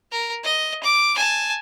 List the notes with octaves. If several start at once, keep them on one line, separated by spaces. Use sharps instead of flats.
A#4
D#5
D6
G#5 A5